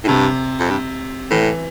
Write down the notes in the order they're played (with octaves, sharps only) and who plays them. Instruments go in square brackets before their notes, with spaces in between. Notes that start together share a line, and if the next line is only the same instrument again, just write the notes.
[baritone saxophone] A2
[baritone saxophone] G2 [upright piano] C3
[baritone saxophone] F2
G2
[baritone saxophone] A2 [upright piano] E3